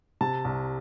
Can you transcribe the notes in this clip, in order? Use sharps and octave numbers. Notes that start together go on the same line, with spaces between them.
C3 A5
C2